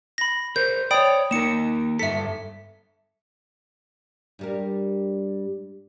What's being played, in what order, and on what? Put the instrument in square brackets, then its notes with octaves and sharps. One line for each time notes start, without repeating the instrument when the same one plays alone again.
[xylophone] B5 A#6
[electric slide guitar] A#4 C5 [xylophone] G6
[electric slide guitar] C#5 D5 [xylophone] G5 B5 D#6
[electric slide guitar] A#3 D#4 A#4 [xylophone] C#7 E7
[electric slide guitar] G2 A4 [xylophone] E5 B6
[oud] G2 G3 A#4